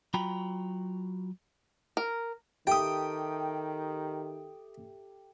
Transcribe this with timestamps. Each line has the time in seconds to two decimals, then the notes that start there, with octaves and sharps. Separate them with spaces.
0.14 F#3 F4 F#4 G5 A#5 B5
1.97 A#4
2.67 D#3 G4 A4 E5 G5 D#6